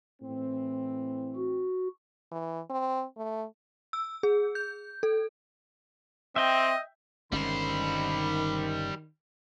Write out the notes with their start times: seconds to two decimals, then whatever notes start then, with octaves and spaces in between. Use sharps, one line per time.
0.22 A2 E3 C4
1.36 F#4
2.32 E3
2.70 C4
3.17 A3
3.93 E6
4.23 G#4
4.55 G6
5.03 A4
6.36 C4 D#5 E5 G5
7.32 G1 D#3 G3 G#3 C#4 C5 B5